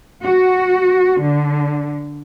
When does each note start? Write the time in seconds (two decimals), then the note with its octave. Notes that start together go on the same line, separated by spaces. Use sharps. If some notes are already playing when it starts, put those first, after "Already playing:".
0.23 F#4
1.22 D3